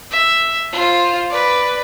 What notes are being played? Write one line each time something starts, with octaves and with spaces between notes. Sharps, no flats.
E5
F4 C5
B4 D5